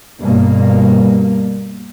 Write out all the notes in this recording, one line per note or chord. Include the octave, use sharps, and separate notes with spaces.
G2 B2 A#3